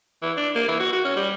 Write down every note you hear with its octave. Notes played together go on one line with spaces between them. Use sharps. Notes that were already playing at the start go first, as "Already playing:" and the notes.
E3
D4
A#3
E3
F#4
F#4
C#4
G3